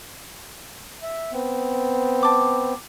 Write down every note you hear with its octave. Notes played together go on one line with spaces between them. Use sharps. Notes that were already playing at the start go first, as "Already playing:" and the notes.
E5
B3 C4
A5 D6